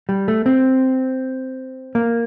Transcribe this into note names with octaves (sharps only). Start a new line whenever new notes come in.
G3
A3
C4
A#3